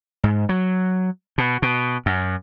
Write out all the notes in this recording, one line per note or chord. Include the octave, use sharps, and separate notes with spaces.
G#2
F#3
B2
B2
F#2